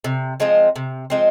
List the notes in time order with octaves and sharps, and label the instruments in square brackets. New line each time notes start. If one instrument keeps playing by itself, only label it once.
[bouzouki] C3
F3 G#3 C4
C3
F3 G#3 C4